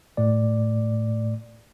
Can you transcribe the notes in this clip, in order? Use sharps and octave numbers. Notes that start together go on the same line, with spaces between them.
A2 A3 D5